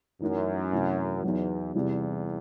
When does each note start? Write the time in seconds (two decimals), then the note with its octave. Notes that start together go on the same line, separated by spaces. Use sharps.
0.21 F#2 E3 A3 D#4
0.72 C3 E3 A3
1.23 E2 F#3 B3 D#4
1.75 E2 C3 E3 G3